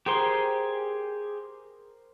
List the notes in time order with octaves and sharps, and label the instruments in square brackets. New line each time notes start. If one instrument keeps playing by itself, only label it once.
[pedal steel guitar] G4 G#4 C6 [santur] A#4 C5